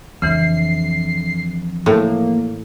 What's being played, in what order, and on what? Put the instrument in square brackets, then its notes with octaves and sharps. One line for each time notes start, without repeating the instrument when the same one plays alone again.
[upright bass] F2 D4 [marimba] C#3 E3 [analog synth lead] C7
[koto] A2 [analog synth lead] A#3